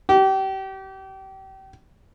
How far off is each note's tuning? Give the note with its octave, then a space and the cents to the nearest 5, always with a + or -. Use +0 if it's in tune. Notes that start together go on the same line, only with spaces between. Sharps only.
G4 -30